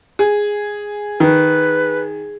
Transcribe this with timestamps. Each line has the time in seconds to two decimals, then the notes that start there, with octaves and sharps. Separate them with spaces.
0.19 G#4
1.20 D#3 B4